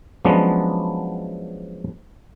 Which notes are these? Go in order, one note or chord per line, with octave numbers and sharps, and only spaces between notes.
F3 F#3 G#3 B3 C#4 D4